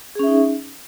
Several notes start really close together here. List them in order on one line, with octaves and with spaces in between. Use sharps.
G#4 C#4 E5 D#4